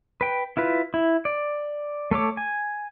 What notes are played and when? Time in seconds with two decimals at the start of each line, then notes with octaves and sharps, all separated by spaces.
0.21 B4 G5
0.57 E4 F4 B4
0.94 E4
1.25 D5
2.11 A3 A4 C#5 D6
2.37 G#5